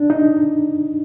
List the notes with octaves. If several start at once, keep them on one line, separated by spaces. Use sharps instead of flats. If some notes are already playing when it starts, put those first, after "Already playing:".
Already playing: D4
D#4